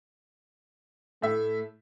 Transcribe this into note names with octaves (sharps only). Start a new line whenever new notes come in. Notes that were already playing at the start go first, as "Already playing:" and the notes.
A2 A3 E5